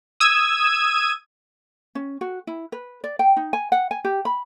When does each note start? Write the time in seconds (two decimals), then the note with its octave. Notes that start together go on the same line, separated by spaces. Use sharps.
0.20 D#6 E6 G#6 D#7
1.95 C#4
2.21 F#4
2.47 E4
2.72 B4
3.04 D5
3.19 G5
3.37 D#4
3.53 G#5
3.72 F#5
3.91 G#5
4.05 G4
4.25 B5